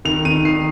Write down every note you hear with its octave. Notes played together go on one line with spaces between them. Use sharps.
D#3 F7
D#3 D#7
D#3 C7